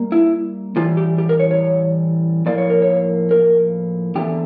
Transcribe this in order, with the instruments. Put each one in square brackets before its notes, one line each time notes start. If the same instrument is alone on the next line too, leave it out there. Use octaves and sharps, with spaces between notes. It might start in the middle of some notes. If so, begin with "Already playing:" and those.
Already playing: [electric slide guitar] G3 A#3
E4
A2 E3 G3 F4
G4
G4
A#4
C#5
C#5
A2 F3 A#3 D5
C#5
A#4
C#5
A#4
E2 D3 A3 G4